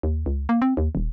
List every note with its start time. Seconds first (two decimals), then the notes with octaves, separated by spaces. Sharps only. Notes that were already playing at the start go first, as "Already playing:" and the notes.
0.03 D#2
0.26 C#2
0.49 A#3
0.62 C4
0.77 D#2
0.95 D#1